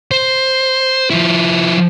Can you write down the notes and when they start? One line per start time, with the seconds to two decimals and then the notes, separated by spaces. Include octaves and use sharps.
0.11 C5
1.10 F3 E4